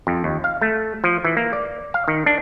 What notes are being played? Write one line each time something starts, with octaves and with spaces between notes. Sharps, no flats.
F2
D#2
F5
A3
F3
E3
A#3
D5
F5
D#3
D4